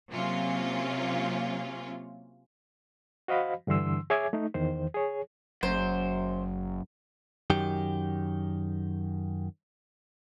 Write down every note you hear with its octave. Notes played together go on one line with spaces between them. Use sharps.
C3 F#3 A#3 C#4 F4
F#4 C5 D#5 F5 B5
G2 D3 E3 C6 E6
G#4 C#5 E5 G#5 D6 G#6
A3 D#4
E2 D#3 C5
G#4 C#5
F#1 F#2 C5
F#2 D#3 G4